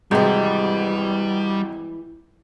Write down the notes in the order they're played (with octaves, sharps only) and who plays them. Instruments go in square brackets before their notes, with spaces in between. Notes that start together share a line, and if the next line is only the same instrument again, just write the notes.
[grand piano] G#1 C3 [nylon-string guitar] E3 G#3 [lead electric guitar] G3 [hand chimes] F#4 D#5 G6